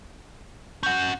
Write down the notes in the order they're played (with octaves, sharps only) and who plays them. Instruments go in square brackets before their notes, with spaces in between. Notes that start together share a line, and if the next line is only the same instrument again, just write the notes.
[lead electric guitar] C#4 F#5 [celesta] G6